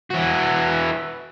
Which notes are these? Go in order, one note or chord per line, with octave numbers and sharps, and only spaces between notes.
E3 F#4